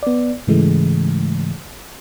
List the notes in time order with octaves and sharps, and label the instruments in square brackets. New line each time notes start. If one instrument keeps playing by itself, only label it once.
[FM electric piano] B3 D5
G#2 C#3 E3 G#3 A3